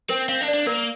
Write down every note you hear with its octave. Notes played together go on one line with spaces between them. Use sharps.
C4 A#4
C4 F5
D4
D5
D4
A#3 A#4